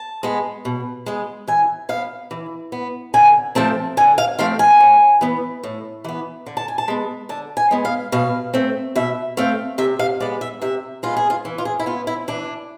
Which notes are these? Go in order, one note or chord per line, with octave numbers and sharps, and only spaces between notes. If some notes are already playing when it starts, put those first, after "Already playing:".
Already playing: A5
G#3 B3
B2
G#3 B3
E3 G#5
B3 F5
E3
B3
D3 G#5
F3 A3 C4 A5
D3 G#5
F5
F3 A3 C4 F5
G#5
A2
E3 B3
A2
E3 B3
D3
A5
G#5
A5
G#3 B3
D3 A5
G#5
G#3 B3
F5
B2 F5
A3 C4
B2 E5
A3 C4 F5
C3 E5
F5
G#3 B3 D5
E5
C3 E5
G#3 B3 F4
G#4
F4
E3
F4
G#4
E4
B3 F4
E4
E3 D4